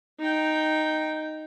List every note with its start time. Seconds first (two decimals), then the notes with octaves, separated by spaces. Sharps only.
0.20 D#4 G5